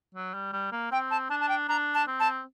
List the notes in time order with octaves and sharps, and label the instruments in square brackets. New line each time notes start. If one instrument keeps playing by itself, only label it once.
[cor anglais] F#3
G3
G3
A#3
[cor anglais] C4 [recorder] G5
[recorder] A5
[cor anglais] D4 [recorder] A5
[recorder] A5
G5
[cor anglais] D4 [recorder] A#5
[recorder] A5
[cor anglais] C4
[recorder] A5